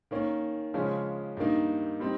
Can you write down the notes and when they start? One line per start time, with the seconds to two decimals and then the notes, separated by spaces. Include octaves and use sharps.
0.11 D#3 A#3 C#4
0.74 C#3 F3 G#3 C#4
1.37 G2 D#3 A#3 D#4
2.00 G3 C4 D#4